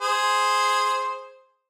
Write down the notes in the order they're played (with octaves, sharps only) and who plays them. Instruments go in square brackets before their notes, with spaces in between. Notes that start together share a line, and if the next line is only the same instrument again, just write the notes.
[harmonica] G#4 C5